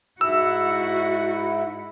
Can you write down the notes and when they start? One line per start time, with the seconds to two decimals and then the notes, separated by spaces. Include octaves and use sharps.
0.21 G#2 E4 F#4 E6